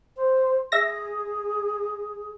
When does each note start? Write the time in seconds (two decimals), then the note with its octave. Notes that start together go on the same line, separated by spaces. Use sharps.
0.16 C5
0.72 G#4 E5 A#6